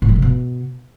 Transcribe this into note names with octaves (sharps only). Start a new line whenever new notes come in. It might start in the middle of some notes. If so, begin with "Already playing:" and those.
A2
F3
C#3
B2